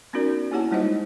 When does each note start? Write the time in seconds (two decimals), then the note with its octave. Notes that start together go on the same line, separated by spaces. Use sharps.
0.13 B3 C#4 D#4 F#4 A#4 D5
0.51 A#3 E4 G4 C#5 F#5 A5
0.71 G3 G#3 D#4 F4 C5 D#5